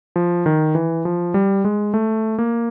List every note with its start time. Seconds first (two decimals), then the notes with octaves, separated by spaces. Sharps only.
0.16 F3
0.46 D#3
0.75 E3
1.05 F3
1.34 G3
1.65 G#3
1.94 A3
2.38 A#3